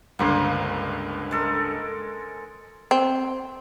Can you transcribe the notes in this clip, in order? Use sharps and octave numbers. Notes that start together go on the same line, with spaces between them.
C#2 G2 D3 A#3 C5
G#3 A4 A#4
C4